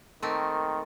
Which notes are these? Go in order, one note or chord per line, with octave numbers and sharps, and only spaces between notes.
D#3 A3 A#3 C4